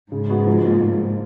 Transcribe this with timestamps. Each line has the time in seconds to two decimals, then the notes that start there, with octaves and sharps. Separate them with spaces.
0.11 G#2 C#3
0.29 G#3 B3 F#4
0.47 F3
0.64 A#3 F4